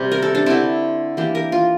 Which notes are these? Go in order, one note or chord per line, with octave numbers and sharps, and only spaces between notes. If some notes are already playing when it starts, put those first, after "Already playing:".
Already playing: C3 G3 C4 G4
A#4
A4
D4
D3 A3 C4 E4
E3 A#3 D4 G4
A#4
F4